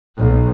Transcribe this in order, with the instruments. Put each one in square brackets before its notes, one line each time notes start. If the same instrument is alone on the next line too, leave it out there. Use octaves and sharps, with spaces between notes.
[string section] B1